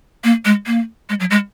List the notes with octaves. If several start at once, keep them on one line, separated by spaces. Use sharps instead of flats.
A#3
G#3
A#3
G#3
F#3
G#3